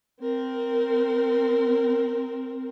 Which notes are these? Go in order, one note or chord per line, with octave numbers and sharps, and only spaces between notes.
C4 A#4